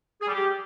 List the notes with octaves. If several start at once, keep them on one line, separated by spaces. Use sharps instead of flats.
G#4
G3
G4